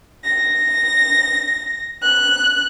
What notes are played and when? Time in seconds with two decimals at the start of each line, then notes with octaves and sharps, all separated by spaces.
0.25 A#6
2.02 F#6